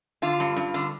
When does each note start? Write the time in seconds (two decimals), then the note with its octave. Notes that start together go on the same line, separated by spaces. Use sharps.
0.22 D3 F4
0.40 G2
0.56 G2
0.74 D3